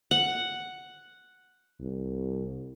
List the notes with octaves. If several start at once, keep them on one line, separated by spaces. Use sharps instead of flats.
F#5
C2